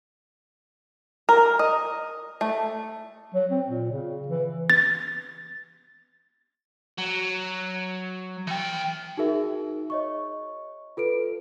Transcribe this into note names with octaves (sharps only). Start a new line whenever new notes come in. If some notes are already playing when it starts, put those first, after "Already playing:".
A#4
D#5
A3
F#3
C4
A#2
C#3
E3
A6
F#3
E3 G5
D#4 F#4 G#4 A#4 E5
C#5 D#5 C#6
F4 A4 B4 D7